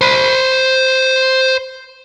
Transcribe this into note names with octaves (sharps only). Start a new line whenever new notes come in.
C5 B5